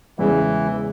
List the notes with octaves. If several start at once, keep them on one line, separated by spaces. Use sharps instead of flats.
E2 C#3 E3 G#3